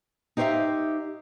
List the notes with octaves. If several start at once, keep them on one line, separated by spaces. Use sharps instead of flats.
D#4 G4 C5 C#5 E5 F5